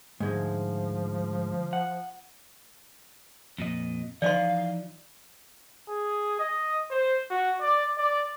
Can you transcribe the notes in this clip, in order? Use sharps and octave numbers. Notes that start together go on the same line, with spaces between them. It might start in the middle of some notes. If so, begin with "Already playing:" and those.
D2 G#2 F3 G#3
F#5
F2 A#2 D#5
E3 F3 D#4 D5 D#5 F5 C6
G#4
D#5
C5
F#4
D5
D5